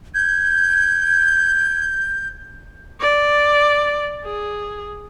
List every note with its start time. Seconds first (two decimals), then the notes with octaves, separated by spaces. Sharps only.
0.14 G6 G#6
3.01 D5
4.24 G#4